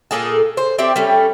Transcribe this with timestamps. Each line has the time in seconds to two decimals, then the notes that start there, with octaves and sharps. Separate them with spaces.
0.11 A#2 A#3 G#4 A4
0.57 C5
0.78 C4 E4 G4 D5
0.96 G3 A3 C#4